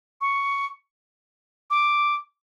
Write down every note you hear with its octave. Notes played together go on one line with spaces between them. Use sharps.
C#6
D6